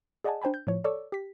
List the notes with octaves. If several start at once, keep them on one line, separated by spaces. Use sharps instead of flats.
G#4 D5 D#5 F#5 G#5 A5
D4 C5 G5 G#5 B5
G6
A2 F3 C#5
A4 C#5 D5 C#6 D6 E6
G4 B6